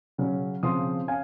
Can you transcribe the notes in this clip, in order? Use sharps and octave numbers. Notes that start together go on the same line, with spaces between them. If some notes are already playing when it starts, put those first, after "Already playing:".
C#3 F#3 C#4
C#3 F3 C4 C6 D#6
C#4 F5 G#5